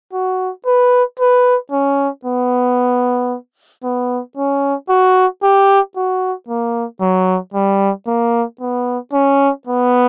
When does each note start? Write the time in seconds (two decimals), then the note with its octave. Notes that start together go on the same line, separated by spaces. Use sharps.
0.13 F#4
0.66 B4
1.20 B4
1.72 C#4
2.25 B3
3.84 B3
4.37 C#4
4.89 F#4
5.43 G4
5.96 F#4
6.48 A#3
7.01 F#3
7.54 G3
8.07 A#3
8.61 B3
9.13 C#4
9.67 B3